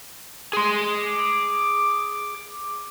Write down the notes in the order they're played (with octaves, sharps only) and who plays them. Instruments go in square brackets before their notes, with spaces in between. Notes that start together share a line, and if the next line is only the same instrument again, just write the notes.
[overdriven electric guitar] G#4 C6
[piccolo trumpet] D6